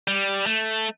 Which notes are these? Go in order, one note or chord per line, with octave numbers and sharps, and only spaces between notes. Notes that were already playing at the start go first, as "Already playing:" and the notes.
G3
A3